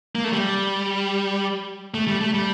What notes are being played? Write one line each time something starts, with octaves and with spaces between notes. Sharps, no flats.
A#3
A3
G3
A3
G3
A3
G3